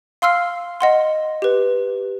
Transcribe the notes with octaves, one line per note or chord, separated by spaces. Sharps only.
F5 C6 E6 F6 C7
D#5 F#5 C6
G4 B4